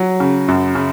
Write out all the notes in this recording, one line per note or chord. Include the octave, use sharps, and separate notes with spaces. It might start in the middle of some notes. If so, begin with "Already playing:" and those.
Already playing: F#3
C#3
F#2
C#3